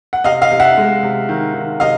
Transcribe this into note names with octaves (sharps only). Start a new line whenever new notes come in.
F#5
C3 D#5 F5
D#5 F5
C3
E5 F#5
G#3
C3
D#3
D#3
C3 D#5 F5